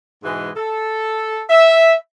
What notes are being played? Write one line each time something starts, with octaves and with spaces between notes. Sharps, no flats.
G#2 B2 E3 G#3
A4
E5